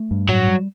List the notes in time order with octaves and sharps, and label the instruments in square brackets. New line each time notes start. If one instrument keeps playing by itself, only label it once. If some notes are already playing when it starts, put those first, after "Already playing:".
Already playing: [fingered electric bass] A3
G2
[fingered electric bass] A2 [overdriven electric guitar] F#3
[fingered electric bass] G3